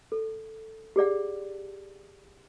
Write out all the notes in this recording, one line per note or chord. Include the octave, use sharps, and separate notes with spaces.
A4
G4 G#4 D5 F#5